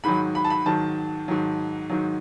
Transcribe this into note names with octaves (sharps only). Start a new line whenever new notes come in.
G#2 D#3 F#3 B5
B5
A5
B5
G#2 D#3 F#3 A5
G#2 D#3 F#3
G#2 D#3 F#3